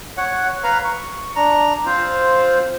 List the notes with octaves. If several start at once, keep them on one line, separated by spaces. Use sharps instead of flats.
C#5 F#5
B4 F5 A#5
C#6
D4 A#5
C4 F4 C5